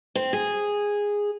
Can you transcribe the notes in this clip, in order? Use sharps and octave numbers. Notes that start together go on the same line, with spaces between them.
C4
G#4